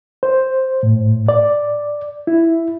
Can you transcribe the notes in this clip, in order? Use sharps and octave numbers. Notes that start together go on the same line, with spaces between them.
C5
A2
D5
E4